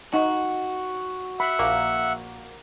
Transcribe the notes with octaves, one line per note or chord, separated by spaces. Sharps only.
D#4 F#4
E5 F#5 B5
A#1 A#3